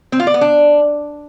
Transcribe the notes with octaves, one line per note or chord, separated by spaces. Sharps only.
C4
F4
D5
B3
D4